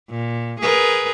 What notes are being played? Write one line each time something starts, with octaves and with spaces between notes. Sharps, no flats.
A#2
G#4 A#4 B4